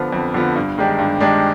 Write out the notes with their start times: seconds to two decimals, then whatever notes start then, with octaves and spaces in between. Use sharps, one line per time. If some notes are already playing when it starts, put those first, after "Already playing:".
Already playing: D3 F3 B3 F4
0.13 F2
0.34 D3 F3 B3 F4
0.55 G2
0.78 D#3 G#3 D4 G4
0.99 G2
1.20 D#3 G#3 D4 G4